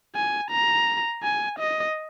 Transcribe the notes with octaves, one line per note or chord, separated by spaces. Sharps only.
G#5
A#5
G#5
D#5